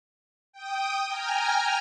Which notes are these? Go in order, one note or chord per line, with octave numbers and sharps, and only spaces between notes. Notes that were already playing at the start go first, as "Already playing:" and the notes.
G5 D#6
G5 G#5 A#5 F6